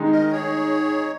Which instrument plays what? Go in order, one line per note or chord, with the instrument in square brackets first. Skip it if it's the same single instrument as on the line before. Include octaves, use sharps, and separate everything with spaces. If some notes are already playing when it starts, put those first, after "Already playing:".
Already playing: [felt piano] D#3 G#3 D#4
[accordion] A#4 D#5
G#4 C#5